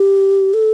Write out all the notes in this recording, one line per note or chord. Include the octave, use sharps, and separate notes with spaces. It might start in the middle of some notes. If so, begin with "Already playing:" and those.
Already playing: G4
A4